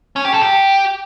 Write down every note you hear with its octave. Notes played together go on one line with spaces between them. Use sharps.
C#4
G4
A4
G4